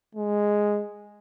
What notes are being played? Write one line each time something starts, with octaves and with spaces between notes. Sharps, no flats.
G#3